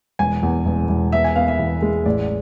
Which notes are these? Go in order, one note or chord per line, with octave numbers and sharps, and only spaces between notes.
E1 G#5
E2
E1
E1
B3 E5
G#5
B3 F5
E5
E2
G#3
A1 D5